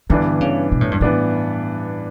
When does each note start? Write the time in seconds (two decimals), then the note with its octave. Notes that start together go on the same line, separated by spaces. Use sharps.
0.10 G2 D3 E3 B3 D4
0.41 C#3
0.72 B2
0.81 A2
0.91 G2
1.01 A2 E3 B3 D4